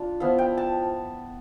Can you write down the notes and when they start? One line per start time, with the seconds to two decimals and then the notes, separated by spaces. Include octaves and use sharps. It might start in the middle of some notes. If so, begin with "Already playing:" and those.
Already playing: D4 F4
0.20 F3 B3 E4 F5
0.38 G5
0.57 A5